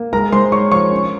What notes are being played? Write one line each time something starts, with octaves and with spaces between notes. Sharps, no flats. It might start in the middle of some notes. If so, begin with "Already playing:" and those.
Already playing: A#3
G#3 A#4 A#5
G#3 C5 C6
G#3 C#5 C#6
F3 C#5 C#6
C#4